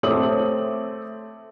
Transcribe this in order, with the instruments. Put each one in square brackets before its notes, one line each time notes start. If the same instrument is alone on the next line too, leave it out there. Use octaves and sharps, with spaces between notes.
[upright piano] A3 C4 C#5 D6 D#6 F#7